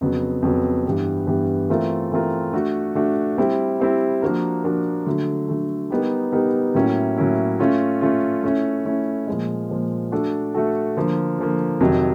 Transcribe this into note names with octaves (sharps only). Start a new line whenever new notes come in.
F2 C#3 F#3 B3
F2 C#3 F#3 B3
G2 E3 G3 B3
G2 E3 G3 B3
E3 A3 C4 F4 A#4
E3 A3 C4 F4 A#4
A3 D4 F#4
A3 D4 F#4
G3 C4 E4
G3 C4 E4
F3 A#3 D4 F#4 A#4
F3 A#3 D4 F#4 A#4
D3 F#3 A3
D3 F#3 A3
G3 B3 D#4 G4 A#4
G3 B3 D#4 G4 A#4
A2 F#3 A#3 C#4 E4
A2 F#3 A#3 C#4 E4
A3 C#4 F4
A3 C#4 F4
A3 C#4 E4
A3 C#4 E4
A#2 F3 G#3
A#2 F3 G#3
A3 D4 F#4 A4
A3 D4 F#4 A4
D3 F3 A#3
D3 F3 A#3
F2 C3 D#3 F#3